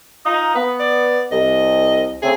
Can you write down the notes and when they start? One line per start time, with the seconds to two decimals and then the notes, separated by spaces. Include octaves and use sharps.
0.26 D#4 F4 A#5 D#6
0.55 B3 B4
0.79 D5
1.32 C2 D#5
2.22 C#3 A3 C4 G#4